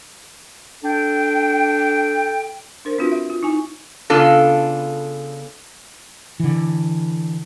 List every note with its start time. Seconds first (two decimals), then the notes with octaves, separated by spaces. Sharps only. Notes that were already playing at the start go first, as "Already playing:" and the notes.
0.83 D4 A4 G5
2.85 D4 A#4 C5
2.98 C4 D4 F4 F#4 B4
3.11 E5
3.30 F4
3.43 D#4 E4 G#5
4.10 C#3 B3 D4 F4 A4
6.40 D3 E3